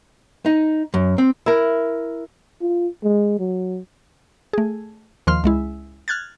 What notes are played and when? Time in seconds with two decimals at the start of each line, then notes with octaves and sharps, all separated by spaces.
0.46 D#4
0.94 F#2
1.18 C4
1.46 E4 A#4
2.62 F4
3.04 G#3
3.39 F#3
4.53 A3 G#4
5.27 D#2 D#3 F3 C6 F6
5.44 C#2 G#3 E4
6.08 F6 F#6 G#6 A6